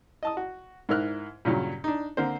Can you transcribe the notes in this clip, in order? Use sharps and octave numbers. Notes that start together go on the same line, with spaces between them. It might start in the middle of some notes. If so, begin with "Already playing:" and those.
D#5 A5 D#6
F#4
G#2 E4 A#4 F6 F#6
G2 A#2 C#3 F#3
D4 D#4
D3 A#3 C4 C5